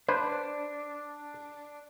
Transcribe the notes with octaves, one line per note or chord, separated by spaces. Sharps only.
D4 B4 C5